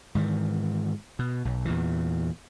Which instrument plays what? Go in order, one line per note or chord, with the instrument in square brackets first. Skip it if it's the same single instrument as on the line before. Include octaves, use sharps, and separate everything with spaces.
[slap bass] G#2 D#3 E3
B2
B1
E2 A#2 E3